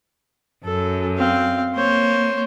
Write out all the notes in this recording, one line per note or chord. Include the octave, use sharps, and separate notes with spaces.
F#2 A4
C4 F5
A#3 C5 C#5